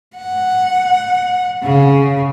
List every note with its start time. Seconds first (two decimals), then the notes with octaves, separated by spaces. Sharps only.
0.16 F#5
1.63 C#3